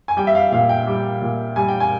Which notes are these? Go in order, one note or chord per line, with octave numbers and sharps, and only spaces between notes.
G#5
G3 G5
E5
F5
A#2 F5
G5
G3
A#2
G3 G#5
G5
G#5